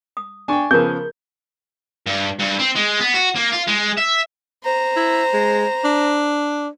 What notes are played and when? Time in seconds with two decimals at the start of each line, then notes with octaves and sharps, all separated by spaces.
0.17 D#6
0.48 D4 G5 G#5 C#6
0.71 C#3 F3 B3 G#4 A#4 A#5 G6
2.06 G2
2.40 G2
2.59 C4
2.76 G#3
3.00 B3
3.14 F#4
3.35 A#3
3.52 F4
3.67 G#3
3.97 E5
4.63 C5 A#5
4.97 E4
5.34 G#3
5.84 D4